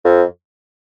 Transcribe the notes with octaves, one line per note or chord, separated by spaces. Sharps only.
F2